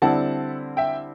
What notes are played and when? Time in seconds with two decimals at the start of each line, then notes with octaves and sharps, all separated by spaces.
0.02 D3 G3 C4 E4 F#5 A5
0.77 E5 G5